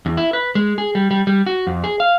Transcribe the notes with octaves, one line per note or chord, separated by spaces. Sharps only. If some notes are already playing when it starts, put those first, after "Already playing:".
E2
E4
B4
G#3
G#4
G3
G3
G3
F#4
F2
G#4
F5